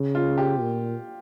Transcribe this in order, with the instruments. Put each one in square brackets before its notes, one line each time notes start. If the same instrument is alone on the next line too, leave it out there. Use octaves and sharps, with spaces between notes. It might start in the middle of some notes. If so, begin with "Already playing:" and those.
Already playing: [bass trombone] C#3
[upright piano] F4
G4
[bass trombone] A#2